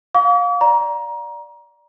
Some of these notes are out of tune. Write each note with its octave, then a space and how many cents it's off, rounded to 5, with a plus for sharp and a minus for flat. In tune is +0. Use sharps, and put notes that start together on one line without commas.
F5 +25 D6 -45
D5 +0 A#5 +20